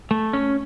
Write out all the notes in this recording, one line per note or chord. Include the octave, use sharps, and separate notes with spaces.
A3
C#4